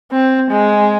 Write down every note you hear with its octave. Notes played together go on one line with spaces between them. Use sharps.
C4
G#3